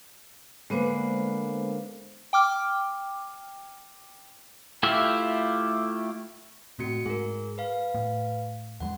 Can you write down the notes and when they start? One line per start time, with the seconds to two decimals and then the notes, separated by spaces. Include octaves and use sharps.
0.70 D3 G#3 A#3 B3 B4 C5
2.33 G5 D6 F6
4.83 A3 E4 F4 G4 E5
6.79 A2 C3 A3 F#4 C#7
7.06 G#2 G#4 A#4
7.58 B4 F5
7.95 A2
8.80 E2 G3 G#3 F#5